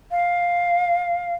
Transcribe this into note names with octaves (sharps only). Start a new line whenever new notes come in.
F5